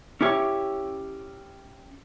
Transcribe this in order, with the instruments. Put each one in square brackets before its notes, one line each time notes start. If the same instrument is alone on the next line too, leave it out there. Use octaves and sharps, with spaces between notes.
[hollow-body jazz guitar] C#4 E4 G4 C#5